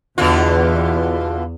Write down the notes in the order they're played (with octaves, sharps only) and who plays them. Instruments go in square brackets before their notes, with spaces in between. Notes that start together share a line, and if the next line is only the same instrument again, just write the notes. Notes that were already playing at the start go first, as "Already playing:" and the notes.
[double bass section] E2 [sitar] B2 D3 F4